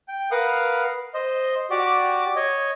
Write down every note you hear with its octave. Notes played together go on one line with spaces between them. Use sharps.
G5
A#4 B4 F5 F#5 D#6 F6
C5 D#5
F#4 G4 D5
C#5 D#5